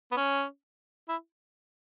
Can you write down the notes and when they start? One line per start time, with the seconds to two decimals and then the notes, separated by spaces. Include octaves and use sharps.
0.11 B3
0.17 C#4
1.09 E4